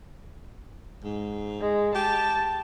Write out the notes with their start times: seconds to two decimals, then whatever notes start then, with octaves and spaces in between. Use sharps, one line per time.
1.04 G#2
1.61 G#3
1.95 G4 A5